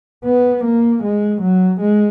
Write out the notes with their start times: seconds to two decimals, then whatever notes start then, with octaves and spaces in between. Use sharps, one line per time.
0.25 B3
0.64 A#3
1.03 G#3
1.42 F#3
1.81 G#3